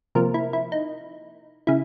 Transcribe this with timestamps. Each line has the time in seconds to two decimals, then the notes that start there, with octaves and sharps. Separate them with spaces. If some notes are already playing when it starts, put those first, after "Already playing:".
0.15 C3 F3 A#3 A#4
0.34 E4
0.53 E4
0.72 D#4
1.67 C#3 E4